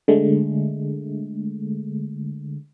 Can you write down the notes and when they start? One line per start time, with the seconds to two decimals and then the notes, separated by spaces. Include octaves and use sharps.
0.08 D3 G#3 A3